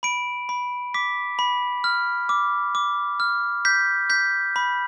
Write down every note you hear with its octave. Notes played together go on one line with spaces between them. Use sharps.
B5 D7
B5
D6 B6
B5
F6
D6
D6
F6
G6 B6
G6 B6
B5